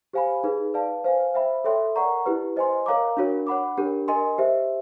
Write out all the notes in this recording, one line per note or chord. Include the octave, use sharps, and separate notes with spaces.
G4 C5 F5 G#5 B5
D#4 G#4 B4
B4 D5 F5 A5
C5 F5 G#5
C5 E5 G5 B5
A4 C#5 E5 G5 C6
A#4 D5 F#5 A#5 C#6
E4 G4 B4
C5 D#5 G#5 C6
A#4 C#5 F5 A#5 D6
D4 F#4 A#4 C#5
C#5 F#5 B5 D6
D4 G4 A#4
A#4 D#5 G#5 C6
G4 C5 E5